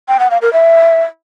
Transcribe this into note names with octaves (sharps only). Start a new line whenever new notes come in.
G5
F#5
F5
A#4
E5